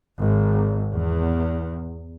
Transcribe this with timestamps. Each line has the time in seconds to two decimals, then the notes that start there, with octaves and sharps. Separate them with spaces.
0.18 G#1
0.93 E2